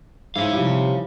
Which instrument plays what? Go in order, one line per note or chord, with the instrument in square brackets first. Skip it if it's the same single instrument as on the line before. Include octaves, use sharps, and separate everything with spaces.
[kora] G#2 E4 [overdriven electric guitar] C#5 F5
[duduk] C3 [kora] E3 F3 G3